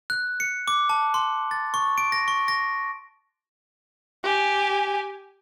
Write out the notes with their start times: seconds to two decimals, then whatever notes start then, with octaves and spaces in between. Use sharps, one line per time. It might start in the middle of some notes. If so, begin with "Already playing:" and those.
0.10 F#6
0.40 C#7
0.68 D6
0.89 A5
1.14 C6
1.51 A6
1.74 C#6
1.98 D7
2.12 A#6
2.28 C#6
2.48 A#6
4.23 G4 G#5